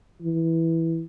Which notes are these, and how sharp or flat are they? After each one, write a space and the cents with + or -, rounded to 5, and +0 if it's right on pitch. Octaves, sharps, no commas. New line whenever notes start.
E3 -5